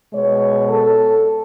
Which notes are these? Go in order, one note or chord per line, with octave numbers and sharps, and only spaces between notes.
B2 G#3 B3 C#5
A4